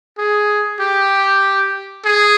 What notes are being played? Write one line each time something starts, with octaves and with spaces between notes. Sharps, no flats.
G#4
G4
G#4